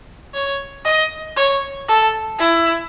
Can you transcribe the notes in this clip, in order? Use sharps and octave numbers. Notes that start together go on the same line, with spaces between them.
C#5
D#5
C#5
A4
E4